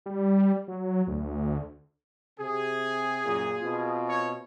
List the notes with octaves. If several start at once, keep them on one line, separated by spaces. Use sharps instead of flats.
G3
F#3
D2
C3 G#4
F#2 A#2
B2 C4 F4
C#5